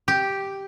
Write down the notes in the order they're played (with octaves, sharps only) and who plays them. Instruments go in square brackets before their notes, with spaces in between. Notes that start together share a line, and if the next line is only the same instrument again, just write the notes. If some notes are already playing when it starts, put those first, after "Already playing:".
[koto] G4